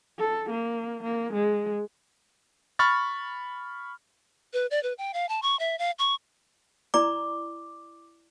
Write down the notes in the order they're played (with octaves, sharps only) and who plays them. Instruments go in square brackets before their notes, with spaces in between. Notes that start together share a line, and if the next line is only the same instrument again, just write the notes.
[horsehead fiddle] A4
A#3
A#3
G#3
[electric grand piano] B5 C#6 F6 A6
[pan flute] B4
D5
B4
G5
F5
A5
C#6
E5
F5
C#6
[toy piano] E4 D5 A#5 [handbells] D6